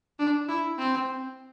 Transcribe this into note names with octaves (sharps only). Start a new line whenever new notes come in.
D4
E4
C4